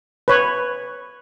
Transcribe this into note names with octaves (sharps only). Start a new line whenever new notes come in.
B4 C#5